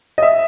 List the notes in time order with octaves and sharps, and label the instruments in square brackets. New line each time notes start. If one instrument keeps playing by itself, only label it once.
[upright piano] D#5
E5